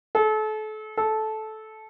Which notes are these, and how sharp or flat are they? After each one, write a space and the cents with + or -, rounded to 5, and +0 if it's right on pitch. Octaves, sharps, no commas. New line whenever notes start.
A4 -35
A4 -15